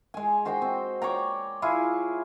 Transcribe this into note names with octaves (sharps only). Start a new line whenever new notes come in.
G#3 G#5
F#4 C5 D#5 G5
C4
C#5 D5 G5 A#5
E4 F4 G#4